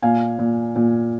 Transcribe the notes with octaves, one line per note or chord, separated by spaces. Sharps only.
A#2 F5 G#5
A#2
A#2